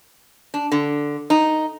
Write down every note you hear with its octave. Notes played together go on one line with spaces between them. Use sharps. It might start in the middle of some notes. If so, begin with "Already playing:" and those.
D4
D3
D#4